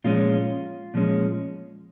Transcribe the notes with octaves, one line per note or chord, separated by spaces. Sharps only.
A#2 F3 G#3 C#4 F4
A#2 F3 G#3 C#4